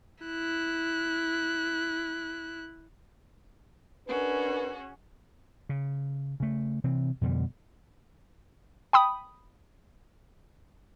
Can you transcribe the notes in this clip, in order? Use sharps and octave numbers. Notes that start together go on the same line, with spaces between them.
E4 F#6
C#4 D4 F#4 G#4 A#4 B4
C#3
C#3 A3
C3 E3 C4
F2 B2 D3 G3
G5 B5 D#6